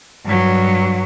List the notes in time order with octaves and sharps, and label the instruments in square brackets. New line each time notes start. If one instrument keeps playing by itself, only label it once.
[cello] G2 F#3